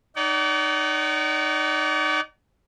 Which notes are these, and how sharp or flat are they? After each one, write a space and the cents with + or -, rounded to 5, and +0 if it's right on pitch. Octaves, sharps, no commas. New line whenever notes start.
D#4 -15 D5 -40 F#5 +40